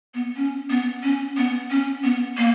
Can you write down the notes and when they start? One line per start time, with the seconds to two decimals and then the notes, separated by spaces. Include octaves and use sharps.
0.14 B3
0.37 C#4
0.70 B3
1.03 C#4
1.37 B3
1.71 C#4
2.04 B3
2.37 A#3